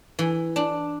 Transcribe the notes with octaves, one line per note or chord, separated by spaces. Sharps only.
E3
D4